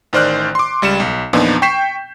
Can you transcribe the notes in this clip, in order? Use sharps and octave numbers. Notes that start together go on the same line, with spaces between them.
A1 D#3 C5 D5 F6 F#6
C6 D6
C#2 G3 C#7 E7
B1
E2 A#2 F3 B3 D4 D#4
G5 C#6 G6 B6 C7 E7